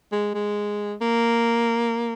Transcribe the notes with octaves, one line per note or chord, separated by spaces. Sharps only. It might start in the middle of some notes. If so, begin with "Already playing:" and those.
G#3
G#3
A#3